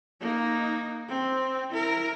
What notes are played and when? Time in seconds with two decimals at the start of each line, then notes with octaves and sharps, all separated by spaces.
0.21 A#3 D#4
1.09 C4
1.71 E4 A#4